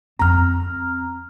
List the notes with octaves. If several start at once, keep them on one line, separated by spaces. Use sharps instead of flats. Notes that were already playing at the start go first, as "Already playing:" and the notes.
F2 C4 A#5 F6